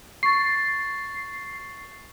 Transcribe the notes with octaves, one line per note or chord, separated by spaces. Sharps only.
C#6 A6 C7